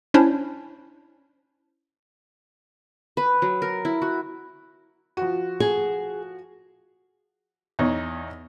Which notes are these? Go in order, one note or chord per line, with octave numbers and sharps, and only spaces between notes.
C#4 D4 E4 C5 C#5
B4
F#3
A#4
E4
F#4
F3 F#4
G#4
E2 D#4 C#5